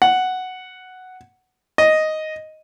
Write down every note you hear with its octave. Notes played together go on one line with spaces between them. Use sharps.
F#5
D#5